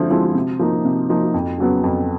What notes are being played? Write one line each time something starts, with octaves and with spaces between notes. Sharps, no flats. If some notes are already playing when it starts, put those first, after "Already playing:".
Already playing: D3 F3 G#3 C4 E4
F3 G#3 C4 E4
C3
F3 A#3 D#4
C3
F3 A#3 D#4
F2
C#3 F#3 B3
F2